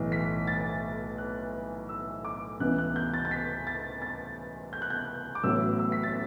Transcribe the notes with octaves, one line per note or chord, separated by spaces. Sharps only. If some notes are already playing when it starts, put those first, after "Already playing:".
Already playing: B1 A2 E3
B6
A6
F#6
E6
D6
C#2 C#3 E3 B3 F#6
F#6
G6
A6
A6
B6
A6
A6
G6
F#6
G6
D6
A1 A2 F#3 B3 E6
E6
B6
A6